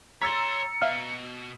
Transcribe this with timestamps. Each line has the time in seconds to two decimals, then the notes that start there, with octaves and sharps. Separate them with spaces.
0.22 C#5 A#5 C6 E6 A6 B6 C#7
0.82 B2 E5 F5 F6